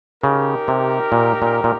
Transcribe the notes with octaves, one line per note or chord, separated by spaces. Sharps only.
C#3 D#4 G4 A#4
C3
A#2
A#2
A#2